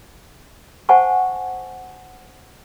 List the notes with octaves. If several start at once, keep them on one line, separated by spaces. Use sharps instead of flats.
C5 F#5 G#5 A5 C#6